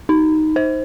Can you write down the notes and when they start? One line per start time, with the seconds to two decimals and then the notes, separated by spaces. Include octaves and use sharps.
0.09 D#4
0.56 C5